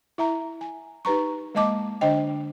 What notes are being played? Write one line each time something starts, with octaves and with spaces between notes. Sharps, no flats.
E4 E5 A#5
G#5
D#4 G4 B4 A#5 C#6
G#3 A#3 D#5 A5 D6
D3 D4 C5 D#5 G5